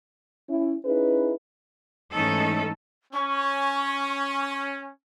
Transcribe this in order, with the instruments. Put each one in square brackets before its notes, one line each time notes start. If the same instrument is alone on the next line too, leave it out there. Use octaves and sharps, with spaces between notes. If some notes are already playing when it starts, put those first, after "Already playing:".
[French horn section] C#4 E4
C#4 D#4 E4 G#4 B4
[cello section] G#2 E3 A3 C#4 D#4 A4
[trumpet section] C#4 [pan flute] C#6